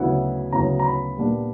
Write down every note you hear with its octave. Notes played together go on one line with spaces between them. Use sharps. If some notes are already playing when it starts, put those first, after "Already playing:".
Already playing: D2 C#3 F#3 B3 E4 F#5
D2 C#3 F#3 B3 E4 A#5
A#5
B5
A#2 G3 B3 D4